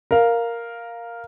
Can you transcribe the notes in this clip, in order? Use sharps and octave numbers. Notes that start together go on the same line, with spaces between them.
A#4 F5